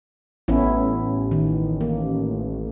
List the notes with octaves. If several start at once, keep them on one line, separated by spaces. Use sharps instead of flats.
A1 B3 C#4 E4
D#3
A#3